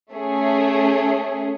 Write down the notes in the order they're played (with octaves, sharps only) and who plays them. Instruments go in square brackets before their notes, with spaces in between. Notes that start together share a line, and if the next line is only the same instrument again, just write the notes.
[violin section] A3 C#4 G#4